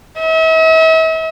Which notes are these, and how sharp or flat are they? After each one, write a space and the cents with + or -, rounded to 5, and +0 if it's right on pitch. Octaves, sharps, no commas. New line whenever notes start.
E5 -45